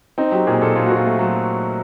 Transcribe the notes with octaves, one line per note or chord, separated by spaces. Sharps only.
C4 D#4
F#3 G4
A#2 G#4
A#2 A4
A#2 F4
A#2 F#4
F4
A3
F#3